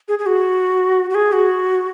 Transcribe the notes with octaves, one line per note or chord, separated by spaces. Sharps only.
G#4
G#4
F#4
F#4
G#4
F#4